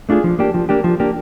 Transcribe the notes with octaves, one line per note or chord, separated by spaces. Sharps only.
A3 D4 F4 G#4
F3
A#3 D4 G4
F3
A#3 D4 G4
F3
A#3 D4 G4